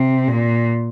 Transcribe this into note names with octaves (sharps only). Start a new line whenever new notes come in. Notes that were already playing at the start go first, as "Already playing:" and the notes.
Already playing: C3
A#2